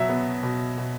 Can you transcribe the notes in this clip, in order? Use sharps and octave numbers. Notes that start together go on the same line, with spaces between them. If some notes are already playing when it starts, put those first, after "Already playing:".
Already playing: B2 F#3 E5
B3
B2
B2